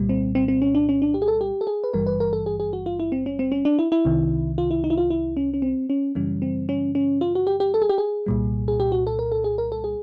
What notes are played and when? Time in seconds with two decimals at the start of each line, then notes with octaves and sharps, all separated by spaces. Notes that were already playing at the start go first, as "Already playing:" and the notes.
Already playing: C2 A#2 G3
0.09 C4
0.35 C4
0.48 C4
0.62 C#4
0.75 D4
0.89 C#4
1.02 D4
1.14 G4
1.22 G#4
1.28 A4
1.41 G4
1.61 A4
1.67 G#4
1.84 B4
1.93 G#1 G2 E3 G3 A#4
2.07 B4
2.20 A#4
2.33 A4
2.46 G#4
2.60 G#4
2.73 F#4
2.86 F4
3.00 E4
3.12 C4
3.26 C#4
3.39 C4
3.52 C#4
3.65 D4
3.79 E4
3.92 E4
4.05 C2 C3 D#3
4.58 F4
4.71 E4
4.84 D#4
4.90 E4
4.98 F4
5.10 E4
5.37 C#4
5.54 C#4
5.62 C4
5.90 C#4
6.15 F#2 C#3 E3 G3 C#4
6.42 C4
6.69 C#4
6.95 C#4
7.21 F4
7.35 F#4
7.47 G4
7.60 G4
7.74 A4
7.82 G#4
7.89 G4
7.98 G#4
8.26 C2 A#2 G3
8.68 G#4
8.80 G4
8.92 F#4
9.07 A4
9.19 A#4
9.32 A4
9.44 G#4
9.58 A#4
9.72 A4
9.84 G#4